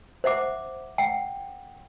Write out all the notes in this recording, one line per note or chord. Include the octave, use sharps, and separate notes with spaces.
C5 E5 F#5 D6
F#5 G5